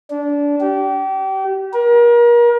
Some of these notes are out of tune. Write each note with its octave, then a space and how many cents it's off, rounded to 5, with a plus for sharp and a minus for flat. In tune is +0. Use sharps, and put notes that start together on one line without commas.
D4 -25
G4 -30
A#4 +35